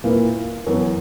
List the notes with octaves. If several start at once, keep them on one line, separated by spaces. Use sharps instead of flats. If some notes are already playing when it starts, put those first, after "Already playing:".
A#2 A#3 E4 B4
F#2 E3 B3